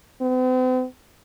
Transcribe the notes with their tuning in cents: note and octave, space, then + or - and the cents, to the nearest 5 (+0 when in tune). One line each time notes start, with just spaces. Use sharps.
C4 -45